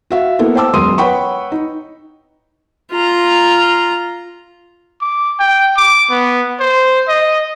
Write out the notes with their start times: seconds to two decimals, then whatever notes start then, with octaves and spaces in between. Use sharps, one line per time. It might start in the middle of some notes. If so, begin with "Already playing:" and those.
0.11 F#4 E5 F5
0.39 A#3 B3 E4 A4
0.55 C5 G5 A5 D6 E6
0.73 E1 F#2 A#4 C6 D#6 D#7
0.98 B4 C#5 F#5 G5 B5 C#6
1.52 D#4
2.92 F4 A#5
5.01 D6
5.39 G5
5.76 D6
6.11 B3
6.60 C5
7.08 D#5